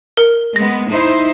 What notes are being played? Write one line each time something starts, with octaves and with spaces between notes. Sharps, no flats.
A#4
G#3 B3 A#6
D#4 E4 C5